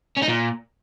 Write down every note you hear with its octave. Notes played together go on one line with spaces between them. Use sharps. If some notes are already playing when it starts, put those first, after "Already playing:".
C#4
D#4
A#2